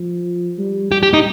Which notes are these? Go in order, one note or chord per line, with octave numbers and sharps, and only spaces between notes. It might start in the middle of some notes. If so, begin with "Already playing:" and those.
Already playing: F3
G3
G3 G4
G4
D#4